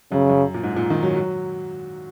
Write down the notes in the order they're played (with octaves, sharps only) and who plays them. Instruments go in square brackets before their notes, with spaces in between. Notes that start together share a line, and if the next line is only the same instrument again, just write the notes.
[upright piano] F#2 [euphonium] C#3
[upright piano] F#2
A#2
G#2
A#2
D#3
F#3
F#3